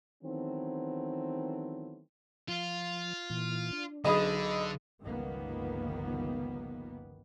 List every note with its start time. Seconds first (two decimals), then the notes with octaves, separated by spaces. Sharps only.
0.22 D#3 E3 F#3 A3 B3 C4
2.48 F3 F4
3.30 A#2 E3
3.72 D4
4.05 B1 D3 G#4 D#5 B5 D#6
5.02 G1 C#2 D#3 F3 A#3 B3